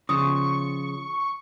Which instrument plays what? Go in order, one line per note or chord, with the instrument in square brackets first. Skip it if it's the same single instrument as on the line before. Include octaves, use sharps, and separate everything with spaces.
[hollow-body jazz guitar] C#3 F3 [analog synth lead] C#6 [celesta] D#6